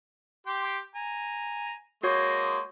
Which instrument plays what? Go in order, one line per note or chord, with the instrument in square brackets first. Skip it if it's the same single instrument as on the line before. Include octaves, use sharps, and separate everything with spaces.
[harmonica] G4 G5 C6
G#5 A#5
[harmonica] G#3 A#3 [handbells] F#4 C#5 G6